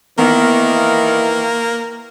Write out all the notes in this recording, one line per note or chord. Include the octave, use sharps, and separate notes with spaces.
D#3 E3 A#3 B3
F5